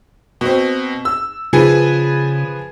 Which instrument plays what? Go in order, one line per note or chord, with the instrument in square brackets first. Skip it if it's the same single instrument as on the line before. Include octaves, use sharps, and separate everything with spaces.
[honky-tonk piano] B2 C4
E6
[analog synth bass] C#3 [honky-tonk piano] F3 G#4 B4